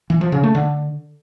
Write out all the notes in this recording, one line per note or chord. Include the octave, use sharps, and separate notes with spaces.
E3
F3
C#3
A3
D3